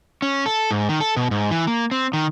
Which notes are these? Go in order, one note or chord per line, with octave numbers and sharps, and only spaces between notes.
C#4
A4
G#2
D#3
A4
B2
G#2
E3
A#3
C4
D#3